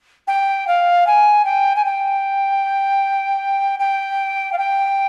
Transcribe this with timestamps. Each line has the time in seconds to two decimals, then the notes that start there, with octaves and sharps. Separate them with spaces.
0.27 G5
0.67 F5
1.06 G#5
1.45 G5
1.76 G#5
1.84 G5
3.79 G5
4.52 F5
4.58 G5